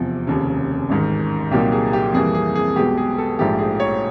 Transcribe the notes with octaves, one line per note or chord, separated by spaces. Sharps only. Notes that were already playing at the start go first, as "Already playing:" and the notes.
Already playing: F1 E2 C3 F3
F1 D#2 C#3
A1 G#2 D#3
C2 A#2 F#3 A#3 D#4 G4
G#4
G4
F2 C3 E3 G3 A#3 G#4
G#4
G#4
B1 B2 G#3 B3 G4
G#4
A4
A#1 G#2 F3 A3 G4
G#4
C#5